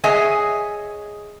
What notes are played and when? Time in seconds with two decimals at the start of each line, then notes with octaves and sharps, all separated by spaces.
0.04 G#4 C#5 D#5 E5 F#5 G#5